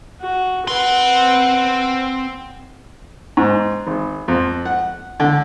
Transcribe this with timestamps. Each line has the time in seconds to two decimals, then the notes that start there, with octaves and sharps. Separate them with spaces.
0.21 F#4
0.67 C4 B4 F#5 C6
3.37 G#2
3.87 G#1
4.28 F2
4.65 F#5
5.20 D3